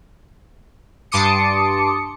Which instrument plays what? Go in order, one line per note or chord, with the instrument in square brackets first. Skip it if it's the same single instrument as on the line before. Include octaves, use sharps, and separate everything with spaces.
[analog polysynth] G2 A5 C6 D6 D#6 C#7